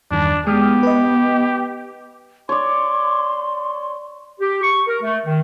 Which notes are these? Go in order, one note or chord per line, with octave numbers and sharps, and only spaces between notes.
E2 G2 D#3 D4
G#3 B3 G4 D#6 F6
B4 D#5
C#5 D5 C6
G4
C#6
A#4
A3
D#3